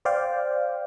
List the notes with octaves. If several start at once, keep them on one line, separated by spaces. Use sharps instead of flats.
C5 D5 F5 G5